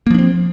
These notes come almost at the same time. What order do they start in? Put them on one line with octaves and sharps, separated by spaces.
A#3 F3 D4 C4